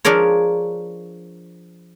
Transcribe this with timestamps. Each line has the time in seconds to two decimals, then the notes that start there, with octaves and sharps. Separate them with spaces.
0.05 F3 D4 G#4 A#4 C#5